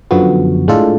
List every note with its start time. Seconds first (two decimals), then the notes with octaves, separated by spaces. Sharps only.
0.11 F#2 D3 F3 B3 F#4
0.68 A2 G#3 D4 F4 A4